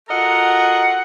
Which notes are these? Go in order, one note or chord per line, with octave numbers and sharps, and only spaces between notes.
F4 F#4 A4 A#4 D#5 F#5